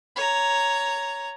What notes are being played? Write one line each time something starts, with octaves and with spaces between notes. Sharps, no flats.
C#5 A#5